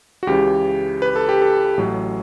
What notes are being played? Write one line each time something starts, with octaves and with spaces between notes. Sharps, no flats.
F#4
C#2 C#3 E3 G4
B4
A4
G4
A4
A1 A2 F#3